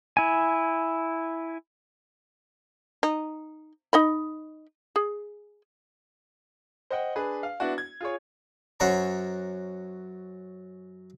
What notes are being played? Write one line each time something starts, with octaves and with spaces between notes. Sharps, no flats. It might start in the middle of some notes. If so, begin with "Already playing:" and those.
E4 G#5
D#4
D#4 D#5 B5
G#4
C5 D#5 F#5 G5
D4 G#4 B4
F5
B3 D4 E4 F#4
G#6
F4 G#4 C#5
F#2 C#4 C5 F#5 G#5 A#5